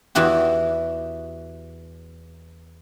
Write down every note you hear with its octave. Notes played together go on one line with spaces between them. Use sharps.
E2 E3 F#4 G4